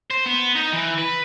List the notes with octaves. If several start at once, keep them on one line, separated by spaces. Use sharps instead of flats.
C5
B3
D#4
E3
B4